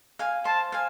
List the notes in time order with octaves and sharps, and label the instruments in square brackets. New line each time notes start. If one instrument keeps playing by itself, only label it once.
[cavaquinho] F5 G#5
[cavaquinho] C5 [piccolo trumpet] A5
[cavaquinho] F5 G#5